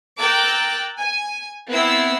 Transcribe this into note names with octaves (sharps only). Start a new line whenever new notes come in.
A#4 G5 D6 E6 F#6 A6
G#5
B3 C4 E4 C6 E6 C7